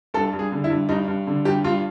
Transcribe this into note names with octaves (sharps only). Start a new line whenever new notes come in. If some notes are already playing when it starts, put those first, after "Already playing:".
G2 A4
G2
G#4
D3
E4
G2
G2 D#4
G2
D3
G2 G4
G2 F4